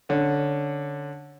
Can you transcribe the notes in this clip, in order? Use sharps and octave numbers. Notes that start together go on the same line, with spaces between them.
D3 C#4